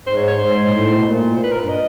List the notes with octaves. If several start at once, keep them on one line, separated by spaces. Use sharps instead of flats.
G#2 C5
C#5
C#5
G#2 C5
A#2
A2
B2
A#2
C5
B4
A#4
G2 B4
D#5